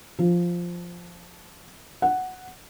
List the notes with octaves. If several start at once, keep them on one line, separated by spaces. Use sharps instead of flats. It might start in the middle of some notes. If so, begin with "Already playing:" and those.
F3
F#5